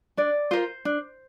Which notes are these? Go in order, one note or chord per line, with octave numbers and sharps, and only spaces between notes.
D4 D5
F4 A#4 C5
D4